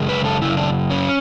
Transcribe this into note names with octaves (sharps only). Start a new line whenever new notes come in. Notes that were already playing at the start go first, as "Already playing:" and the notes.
Already playing: F#2 C#3 G#3
B4
A4
F#2 C#3 E4
D4
C#4